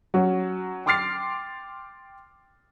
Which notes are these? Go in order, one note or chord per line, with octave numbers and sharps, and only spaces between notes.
F#3 C#4 F#4
G5 C6 D6 F6 A6 C7